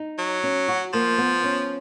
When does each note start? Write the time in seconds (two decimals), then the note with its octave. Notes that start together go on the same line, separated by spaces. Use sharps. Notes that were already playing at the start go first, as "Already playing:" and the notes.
Already playing: D#4
0.19 F#3
0.43 C#4
0.68 F#4
0.93 F3 A#3
1.18 B3
1.44 C#4